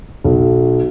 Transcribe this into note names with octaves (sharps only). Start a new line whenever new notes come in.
B1